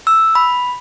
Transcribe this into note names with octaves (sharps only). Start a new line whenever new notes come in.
E6
B5